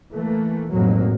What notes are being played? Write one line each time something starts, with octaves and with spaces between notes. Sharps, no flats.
E3 A3 A#3
A1 F2 G#2 B2 F#3 A#3